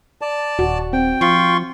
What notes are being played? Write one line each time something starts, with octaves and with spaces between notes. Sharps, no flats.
D5 A5
D#1 F#4
C4 G5
F3 F4 C6 C#6